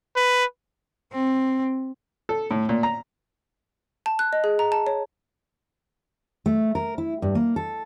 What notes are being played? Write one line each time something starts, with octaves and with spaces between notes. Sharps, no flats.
B4
C4
A4
A2
A#2
A#5
A5
F#6
D#5
G#4
A#5
A5
C#5
A3
A#4
E4
G2
A#3
A4